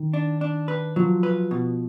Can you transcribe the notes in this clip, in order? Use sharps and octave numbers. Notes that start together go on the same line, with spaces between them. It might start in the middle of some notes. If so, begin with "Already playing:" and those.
Already playing: D#3
D4
D4
B4
F3 F#3
B4
B2